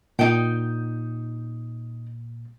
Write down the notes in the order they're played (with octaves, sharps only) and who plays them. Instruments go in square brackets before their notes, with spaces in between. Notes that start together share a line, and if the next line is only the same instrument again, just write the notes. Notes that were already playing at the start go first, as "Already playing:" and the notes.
[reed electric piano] A#2 [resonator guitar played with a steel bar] D#4 G5